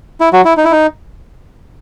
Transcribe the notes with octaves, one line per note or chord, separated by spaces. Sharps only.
E4
F#3 F#4
E4
D#4
E4
D#4